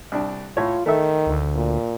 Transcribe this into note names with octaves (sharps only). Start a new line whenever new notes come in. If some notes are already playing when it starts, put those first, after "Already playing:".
C2 D4
A2 F4 C#5
D#3 A3 A4 E5
D2
A#2